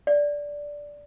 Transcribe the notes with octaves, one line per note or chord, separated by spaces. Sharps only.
D5